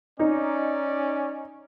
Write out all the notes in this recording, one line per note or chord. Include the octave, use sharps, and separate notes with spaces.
C#4 D#4 D5